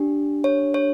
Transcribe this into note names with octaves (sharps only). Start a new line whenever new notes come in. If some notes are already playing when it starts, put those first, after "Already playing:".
Already playing: D4 G4
C#5
C#5